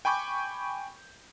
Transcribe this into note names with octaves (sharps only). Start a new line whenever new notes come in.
G5 G#5 B5 C#6 D6 G6